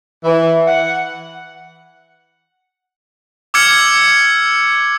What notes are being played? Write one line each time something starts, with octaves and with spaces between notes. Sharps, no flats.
E3
F#5
D6 E6 F6 G#6 C#7